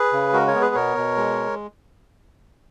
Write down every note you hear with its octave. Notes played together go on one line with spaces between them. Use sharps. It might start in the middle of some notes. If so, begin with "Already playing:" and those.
Already playing: G#4 B4
C#3
G#3 F#4 A#4
A#4 C#5
B3
G#4 B4
B2 A#4 C#5
B2
G#3